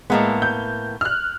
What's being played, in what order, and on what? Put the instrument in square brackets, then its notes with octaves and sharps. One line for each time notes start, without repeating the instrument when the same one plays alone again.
[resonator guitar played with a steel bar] A2 A#3 B3 [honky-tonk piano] G#3
[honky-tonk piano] G6
F6 F#6